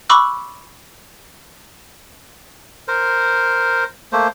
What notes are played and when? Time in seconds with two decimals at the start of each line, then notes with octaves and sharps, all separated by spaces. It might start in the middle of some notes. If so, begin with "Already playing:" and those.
0.09 B5 C#6 D6 E6 F#6
2.88 A#4 C5
4.12 A3 A#3 C5